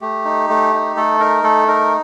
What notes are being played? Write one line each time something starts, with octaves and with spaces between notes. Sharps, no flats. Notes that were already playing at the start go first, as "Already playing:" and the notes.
A3 G4
D#4
A3
D#4
A3 A4
D#4 A#4
A3 A4
D#4 A#4